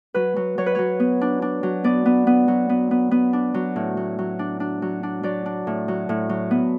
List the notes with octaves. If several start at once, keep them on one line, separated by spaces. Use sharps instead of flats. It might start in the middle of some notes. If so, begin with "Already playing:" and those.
F#3 B4
F#3
F#3 C#5
B4
F#3 C#5
B3
D4
D4
F#3
B3 D5
B3
B3
F#3
B3
B3
B3
D4
F#3
A2
F#3
F#3
D4
D4
F#3
D4
F#3 D5
D4
A2
F#3
A2
F#3
B3